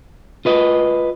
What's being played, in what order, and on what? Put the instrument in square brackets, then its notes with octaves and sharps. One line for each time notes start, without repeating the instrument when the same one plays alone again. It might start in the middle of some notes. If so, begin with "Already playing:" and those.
[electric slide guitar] F4 B4 D#5